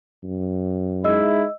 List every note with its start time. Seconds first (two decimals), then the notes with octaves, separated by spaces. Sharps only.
0.23 F#2
1.04 G#3 D#4 E4 D#5 E6